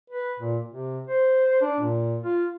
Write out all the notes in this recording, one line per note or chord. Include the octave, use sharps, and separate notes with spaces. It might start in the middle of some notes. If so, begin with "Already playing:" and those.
B4
A#2
C3
C5
D4
A#2
F4